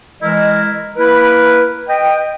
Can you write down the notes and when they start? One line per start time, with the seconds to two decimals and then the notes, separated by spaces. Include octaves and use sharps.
0.22 E3 G#3 E4 A#4 D#5
0.96 A#3 E4 A#4 B4
1.88 B4 D#5 G5